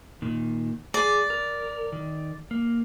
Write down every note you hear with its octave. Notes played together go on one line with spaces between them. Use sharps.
A#2 D#3
G#4 D5
A#4
D#3
A#3